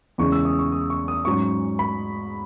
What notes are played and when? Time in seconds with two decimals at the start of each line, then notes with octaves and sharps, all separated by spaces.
0.18 E2 C#3 E3 G#3 C#6
0.32 E6
0.45 D#6
0.59 C#6
0.72 D#6
0.90 C#6
1.08 D#6
1.25 G#2 F#3 C#4 C#6
1.79 B5